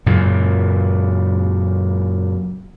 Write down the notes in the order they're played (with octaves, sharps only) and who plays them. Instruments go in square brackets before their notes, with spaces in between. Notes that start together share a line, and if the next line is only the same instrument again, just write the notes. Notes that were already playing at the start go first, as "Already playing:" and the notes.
[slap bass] F#2 A#2 C#3